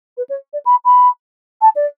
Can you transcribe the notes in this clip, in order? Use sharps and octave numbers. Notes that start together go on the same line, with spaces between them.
B4
C#5
D5
B5
B5
A5
D5